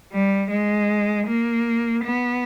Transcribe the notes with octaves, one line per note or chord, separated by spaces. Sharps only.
G3
G#3
A#3
B3